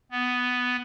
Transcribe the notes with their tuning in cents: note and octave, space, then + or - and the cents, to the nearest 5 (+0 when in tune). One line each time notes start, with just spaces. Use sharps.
B3 +5